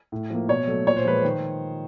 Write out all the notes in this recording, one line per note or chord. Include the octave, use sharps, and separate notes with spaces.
A2
F3 A#3
B2 C#5
F#3 A3
A#2 C#5
C5
F3 G#3 B4
C5
D#3